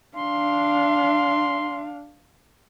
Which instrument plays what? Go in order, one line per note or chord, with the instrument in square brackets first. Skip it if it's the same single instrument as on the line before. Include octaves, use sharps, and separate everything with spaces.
[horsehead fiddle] D4 F5 [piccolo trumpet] C6